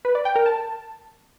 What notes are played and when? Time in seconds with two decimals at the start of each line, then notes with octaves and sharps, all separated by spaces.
0.05 B4
0.15 D5
0.25 G5
0.36 A#4
0.46 A5